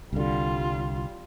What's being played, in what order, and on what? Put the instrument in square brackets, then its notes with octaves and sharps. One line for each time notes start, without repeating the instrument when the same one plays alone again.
[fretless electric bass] C2 D3 [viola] G3 F4